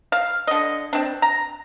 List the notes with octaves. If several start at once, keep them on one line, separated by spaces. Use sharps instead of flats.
F5
D3 D#5
C4 D4
A#5